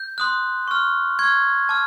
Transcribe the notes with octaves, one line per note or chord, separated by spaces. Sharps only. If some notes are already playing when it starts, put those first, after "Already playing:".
Already playing: G6
C6 D#6 F#6
C#6 F6
C#6 F6 G#6
A5 D6 F6